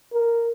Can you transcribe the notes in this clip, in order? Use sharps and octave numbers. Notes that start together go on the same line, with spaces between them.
A#4